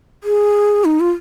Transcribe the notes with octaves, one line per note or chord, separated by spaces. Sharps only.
G#4
D#4
F4